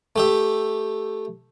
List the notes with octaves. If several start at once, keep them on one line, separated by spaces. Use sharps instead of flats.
A3 G4 E5